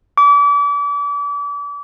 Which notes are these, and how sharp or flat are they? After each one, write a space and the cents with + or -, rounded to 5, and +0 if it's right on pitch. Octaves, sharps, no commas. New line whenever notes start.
D6 -35